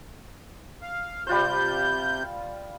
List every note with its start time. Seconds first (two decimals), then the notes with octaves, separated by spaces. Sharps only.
0.82 F5
1.27 C3 G3 F4 C5 G6